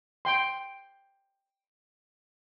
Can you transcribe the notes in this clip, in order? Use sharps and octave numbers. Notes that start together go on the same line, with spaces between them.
G5 C6